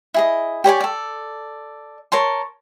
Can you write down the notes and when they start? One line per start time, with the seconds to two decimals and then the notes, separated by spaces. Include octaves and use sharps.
0.14 E4 G#4 D#5
0.64 G4 C#5 D5 G#5
0.80 A4 D5
2.12 A#4 C#5 A5 C6